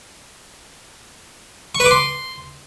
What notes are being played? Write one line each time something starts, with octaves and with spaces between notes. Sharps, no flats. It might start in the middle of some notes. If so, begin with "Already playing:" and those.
C#6
B4
D6
C6